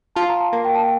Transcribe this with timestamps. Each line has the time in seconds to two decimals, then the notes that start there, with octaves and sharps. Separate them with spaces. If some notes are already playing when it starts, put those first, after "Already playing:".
0.16 F4 A5
0.29 A#5
0.40 A5
0.53 A#3
0.65 G5
0.75 A5
0.84 G5